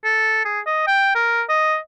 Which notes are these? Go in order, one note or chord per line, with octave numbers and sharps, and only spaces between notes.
A4
G#4
D#5
G5
A#4
D#5